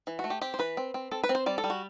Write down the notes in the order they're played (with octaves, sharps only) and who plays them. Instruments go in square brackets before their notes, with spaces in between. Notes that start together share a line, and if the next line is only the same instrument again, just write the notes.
[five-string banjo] E3
F#4
A3
G4
C4 G4
C5
E3 B4
C4
C4
C4 A4
B4
C4
C5
G3 D5
A4
G3
F#4